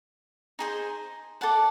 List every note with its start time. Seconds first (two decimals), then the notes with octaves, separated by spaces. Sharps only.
0.59 D#4 G#4 C5
1.41 A4 D5 F#5 A5